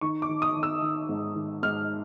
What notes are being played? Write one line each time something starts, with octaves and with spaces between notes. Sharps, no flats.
D#3 C#6
D6
D#3
D#6
D#3
E6
D#3
G#2
D#3
G#2 F6